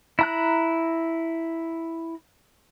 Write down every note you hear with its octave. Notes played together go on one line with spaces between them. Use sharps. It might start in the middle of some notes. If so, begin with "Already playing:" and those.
E4 A#5 F#6